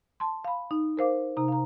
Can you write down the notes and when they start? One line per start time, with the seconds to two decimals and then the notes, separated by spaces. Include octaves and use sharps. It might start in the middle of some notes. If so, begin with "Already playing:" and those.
0.20 A5 C6
0.45 F5 B5
0.71 D#4
0.97 A#4 C5 F5 D6
1.37 C3 D#4 A#5
1.48 F5 A#5